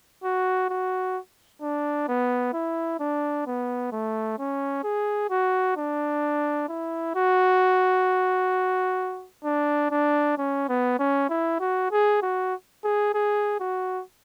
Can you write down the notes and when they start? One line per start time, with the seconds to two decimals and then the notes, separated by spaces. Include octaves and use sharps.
0.24 F#4
0.70 F#4
1.62 D4
2.08 B3
2.53 E4
2.99 D4
3.47 B3
3.92 A3
4.39 C#4
4.84 G#4
5.30 F#4
5.77 D4
6.68 E4
7.15 F#4
9.45 D4
9.91 D4
10.38 C#4
10.69 B3
10.99 C#4
11.29 E4
11.60 F#4
11.91 G#4
12.22 F#4
12.84 G#4
13.14 G#4
13.60 F#4